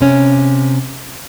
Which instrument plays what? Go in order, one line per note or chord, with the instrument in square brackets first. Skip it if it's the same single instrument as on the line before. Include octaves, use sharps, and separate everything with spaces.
[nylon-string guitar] C3 C#4